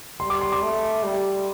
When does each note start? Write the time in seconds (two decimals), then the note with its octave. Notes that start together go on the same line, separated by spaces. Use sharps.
0.20 G3 C6
0.30 D6
0.41 C6
0.52 D6
0.63 A3
1.04 G3